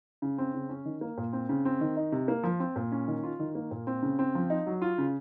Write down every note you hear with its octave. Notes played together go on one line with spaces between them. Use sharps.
C#3
C4
C#3
C#4
D#3
A#3
A#2
C4
C#3
C4
D#3
D#4
C3
A#3
F3
C4
A#2
C#4
D#3
F4
D#3
A#3
A#2
C4
C#3
C4
F3
D#4
F#3
F4
C#3